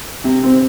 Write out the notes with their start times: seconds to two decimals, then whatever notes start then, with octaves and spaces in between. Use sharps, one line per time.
0.24 C3
0.43 C4